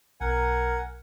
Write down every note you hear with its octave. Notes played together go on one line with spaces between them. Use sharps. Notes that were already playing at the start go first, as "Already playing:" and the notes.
B1 A#4 F#5 G#5